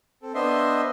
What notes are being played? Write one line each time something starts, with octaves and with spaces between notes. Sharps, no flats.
C4 A4
B3 D4 C5 D#5 E5 C6